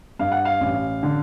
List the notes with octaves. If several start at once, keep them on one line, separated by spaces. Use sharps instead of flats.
G2 F5
F#5
F5
A1
D3